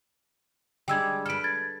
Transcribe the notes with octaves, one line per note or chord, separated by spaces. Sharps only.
G3 G#3 D4 G5 E6 G#6
A4 B4 F6 D7
G#6 A6